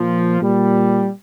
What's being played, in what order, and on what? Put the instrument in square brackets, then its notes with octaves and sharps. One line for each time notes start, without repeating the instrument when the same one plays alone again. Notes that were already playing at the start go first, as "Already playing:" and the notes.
Already playing: [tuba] A#2 [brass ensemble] F3
[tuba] A#2 [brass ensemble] G3